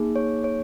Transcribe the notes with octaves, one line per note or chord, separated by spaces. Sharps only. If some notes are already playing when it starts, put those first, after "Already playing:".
Already playing: A#3 D#4 G#4
C#5
C#5